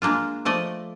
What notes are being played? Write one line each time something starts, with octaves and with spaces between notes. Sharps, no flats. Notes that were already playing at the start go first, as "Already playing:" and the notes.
G#3 A#3 D4 F4
F3 A3 D5 D#5